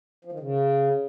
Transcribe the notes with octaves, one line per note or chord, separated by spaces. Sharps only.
F3
D#3
C#3